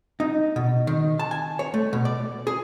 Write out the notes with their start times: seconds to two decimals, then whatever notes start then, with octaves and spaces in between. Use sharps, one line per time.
0.20 D#4
0.56 B2
0.87 D#3
1.19 A5
1.31 G#5
1.59 C#5
1.74 A3
1.93 B2
2.05 D5
2.47 G#4